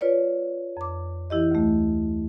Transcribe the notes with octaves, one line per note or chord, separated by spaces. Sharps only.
F4 B4 C#5 D5
F2 D6
E3 E4 G4 D#5
D2 A3